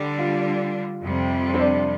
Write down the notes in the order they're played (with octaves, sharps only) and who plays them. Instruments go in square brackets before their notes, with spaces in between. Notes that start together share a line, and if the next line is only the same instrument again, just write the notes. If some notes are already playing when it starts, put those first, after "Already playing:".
Already playing: [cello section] D3 G3 D4
[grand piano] F4
[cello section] F2 C3 G3
[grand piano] C4
D4